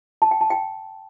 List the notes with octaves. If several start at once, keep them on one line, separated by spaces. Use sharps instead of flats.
A5
G5
A5
G5